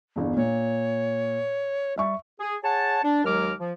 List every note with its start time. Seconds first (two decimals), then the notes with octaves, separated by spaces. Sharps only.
0.16 G1 E2
0.37 A#2 C#5
1.98 G3 E5 C#6
2.40 G#4
2.63 G#4 C#5 F#5 A5
3.03 D4
3.25 D#2 F#3 G#3 A#4 D6 F6
3.59 F3